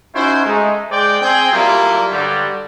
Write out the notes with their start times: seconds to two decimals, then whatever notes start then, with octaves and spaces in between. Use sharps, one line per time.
0.13 C#4 D#4 E4 F#4 C5
0.44 G#3 A3 D#4
0.90 G#3 C5 D5 G5
1.21 C4 G#4 G5
1.52 F#3 G3 A3 A#3 E4 F4
2.10 G2 D3 F#3 G3